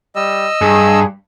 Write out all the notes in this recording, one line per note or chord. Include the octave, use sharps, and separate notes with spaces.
G3 D#5 E6
G2 G#4